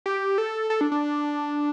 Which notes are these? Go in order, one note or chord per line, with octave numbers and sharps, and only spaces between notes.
G4
A4
A4
D4
D4